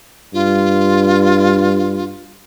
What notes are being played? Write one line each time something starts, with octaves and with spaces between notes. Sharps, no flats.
G2 F4